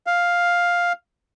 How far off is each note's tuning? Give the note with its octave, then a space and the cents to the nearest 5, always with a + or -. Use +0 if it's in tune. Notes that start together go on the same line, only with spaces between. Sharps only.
F5 +5